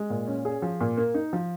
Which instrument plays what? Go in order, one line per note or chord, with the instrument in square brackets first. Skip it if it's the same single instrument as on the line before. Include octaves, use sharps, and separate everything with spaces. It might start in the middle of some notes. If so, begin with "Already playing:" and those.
Already playing: [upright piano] G#3
A#2
C#4
G#4
F3
A#2
A#3
D#4
F3